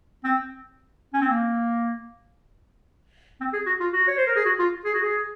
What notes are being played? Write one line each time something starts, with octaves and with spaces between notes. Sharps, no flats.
C4
C#4
C4
A#3
C4
G#4
F#4
F4
F#4
C#5
C5
A#4
G#4
F#4
F4
G#4
F#4
G#4